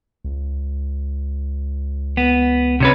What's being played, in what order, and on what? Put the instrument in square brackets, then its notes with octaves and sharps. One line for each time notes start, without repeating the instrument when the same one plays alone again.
[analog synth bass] C#2
[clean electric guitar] B3
C3 C#4 B4